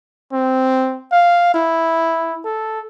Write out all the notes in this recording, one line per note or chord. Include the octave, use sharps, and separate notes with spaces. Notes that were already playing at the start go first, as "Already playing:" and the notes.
C4
F5
E4
A4